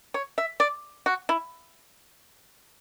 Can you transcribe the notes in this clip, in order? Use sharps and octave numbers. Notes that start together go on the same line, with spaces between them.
C#5
E5
D5
F#4
E4